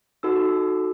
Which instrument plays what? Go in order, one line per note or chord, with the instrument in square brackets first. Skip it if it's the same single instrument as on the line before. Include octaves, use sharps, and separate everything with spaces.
[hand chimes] D#4 F#4 A4 E6